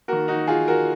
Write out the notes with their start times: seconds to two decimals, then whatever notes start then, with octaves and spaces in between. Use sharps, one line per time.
0.08 D#3 A#3 F#4 A#4
0.28 D#4 F#4
0.47 F4 G#4
0.68 F#4 A#4